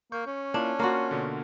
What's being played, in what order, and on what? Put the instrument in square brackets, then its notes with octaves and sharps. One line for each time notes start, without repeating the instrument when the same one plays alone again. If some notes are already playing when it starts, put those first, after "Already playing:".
[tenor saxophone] A#3 [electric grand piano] C#6 G6
[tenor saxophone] C#4
[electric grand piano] A#3 E4 F4 [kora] D4
[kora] A#3 F4 F#4 [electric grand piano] F6
[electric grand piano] B2 D3